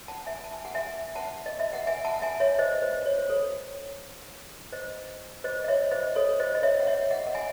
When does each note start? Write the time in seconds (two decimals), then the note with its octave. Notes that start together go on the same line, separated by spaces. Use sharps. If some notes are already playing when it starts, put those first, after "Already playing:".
0.08 F#5 A5
0.26 E5 G#5
0.44 A5
0.54 G#5
0.65 F#5
0.74 E5 G#5
1.15 F#5 A5
1.46 D#5
1.60 E5
1.73 F#5
1.87 E5 G#5
2.05 F#5 A5
2.22 E5 G#5
2.40 C#5 E5
2.59 C5 D#5
2.82 C5
3.06 C#5
3.18 C5
3.29 A4 C#5
4.72 C5 D#5
5.44 C5 D#5
5.64 D#5
5.68 C#5 E5
5.91 C5 D#5
6.15 A4 C#5
6.39 C5 D#5
6.55 D#5
6.63 C#5 E5
6.80 F#5
6.87 C#5 E5
7.11 D#5 F#5
7.27 F#5
7.35 E5 G#5